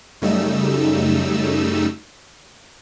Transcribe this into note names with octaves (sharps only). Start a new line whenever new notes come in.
F#2 C#3 G3 A3 D#4 E6